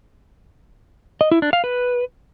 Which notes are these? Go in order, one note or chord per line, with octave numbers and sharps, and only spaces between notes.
D#5
E4
D4
F5
B4